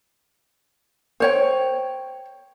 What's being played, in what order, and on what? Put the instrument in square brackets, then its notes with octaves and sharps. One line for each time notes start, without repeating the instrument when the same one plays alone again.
[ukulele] C5 C#5 G5